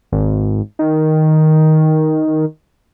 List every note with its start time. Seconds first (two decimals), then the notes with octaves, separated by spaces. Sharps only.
0.12 G#1
0.79 D#3